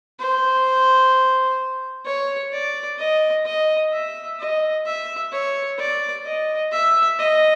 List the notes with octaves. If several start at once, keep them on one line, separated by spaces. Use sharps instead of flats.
C5
C#5
D5
D#5
D#5
E5
D#5
E5
C#5
D5
D#5
E5
D#5